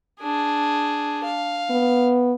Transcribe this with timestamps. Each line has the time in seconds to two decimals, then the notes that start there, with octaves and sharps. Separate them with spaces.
0.22 D4 G#4
1.24 F5
1.70 B3